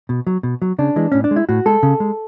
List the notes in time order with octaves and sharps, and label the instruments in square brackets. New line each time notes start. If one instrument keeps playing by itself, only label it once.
[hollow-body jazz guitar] B2
F#3
B2
F#3
C#3 D4
E3 G#3
A2 C#4
D4
G#3
E4
A2 F#4
G#3 A4
C#3
G#3